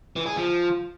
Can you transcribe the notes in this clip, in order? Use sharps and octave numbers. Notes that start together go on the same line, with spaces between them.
E3
G#4
F3